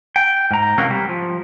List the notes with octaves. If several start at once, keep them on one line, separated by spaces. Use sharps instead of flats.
G5
G#2 A#5
C3 E3 F#3 A#3 C#4
G3
F3